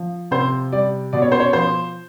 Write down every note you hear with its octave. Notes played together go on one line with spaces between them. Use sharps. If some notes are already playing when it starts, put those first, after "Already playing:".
Already playing: F3
C3 C5
G3 D5
B2 D5
C#5
C5
C#5
F3 C5